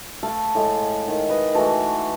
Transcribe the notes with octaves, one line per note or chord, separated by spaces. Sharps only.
A3 A4 F5
A2 G#3
D#3
B4 D#5
E3 A3 F#4 A5